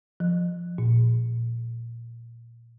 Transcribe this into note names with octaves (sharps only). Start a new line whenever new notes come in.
F3
A#2